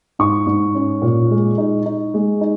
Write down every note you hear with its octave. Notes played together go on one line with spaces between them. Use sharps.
G#2 C#6
G#2
C#4
A#2
G#3
D#4
D#4
G#3
D#4